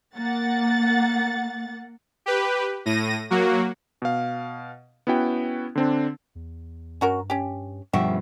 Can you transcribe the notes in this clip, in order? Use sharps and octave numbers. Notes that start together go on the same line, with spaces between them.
A#3 F#5 A6
G4 B4
A2 A#6 D#7
F#3 A#3 F#4
B2 F5
B3 C#4 E4 F#4 G5
D3 C4 D4
E2
G2 C#4 F#4 A#4
C#4 G4
G2 B2 F3 F#4 G4 E5